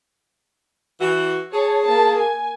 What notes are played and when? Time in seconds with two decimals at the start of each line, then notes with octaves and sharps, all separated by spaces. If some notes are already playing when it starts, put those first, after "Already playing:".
1.00 E3 F#4
1.54 G#4 C#5 A5
1.86 A#3 A5
2.19 G#5